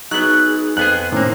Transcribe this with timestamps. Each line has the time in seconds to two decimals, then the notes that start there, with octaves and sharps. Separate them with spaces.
0.11 F#3 B3 D#4 G#4 F#6
0.77 F2 B3 G#4 F#6
1.12 A2 C3 D#3 A#3 C#4 C5